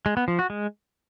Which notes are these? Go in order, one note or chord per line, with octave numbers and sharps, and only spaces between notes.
G#3
B3
F3
F#4
G#3